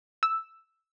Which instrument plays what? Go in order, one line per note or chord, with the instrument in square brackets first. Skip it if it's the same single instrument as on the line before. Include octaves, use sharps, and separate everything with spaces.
[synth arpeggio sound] E6